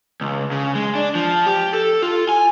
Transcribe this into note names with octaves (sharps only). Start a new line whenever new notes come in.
C#2
C#3
G#3
D4
F3
G4
A4
F4
G#5